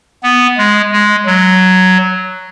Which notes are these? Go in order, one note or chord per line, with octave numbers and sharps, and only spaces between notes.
B3
G#3
G#3
F#3